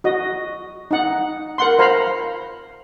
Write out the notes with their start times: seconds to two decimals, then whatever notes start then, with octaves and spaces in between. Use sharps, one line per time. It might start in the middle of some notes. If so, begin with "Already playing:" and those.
0.04 F#4 D#5
0.91 D#4 F#5
1.58 A#4 F#5 C6
1.79 C5 F5 A#5 B5